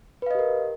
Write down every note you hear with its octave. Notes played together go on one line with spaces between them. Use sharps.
G4 A#4 B4 D#5 F5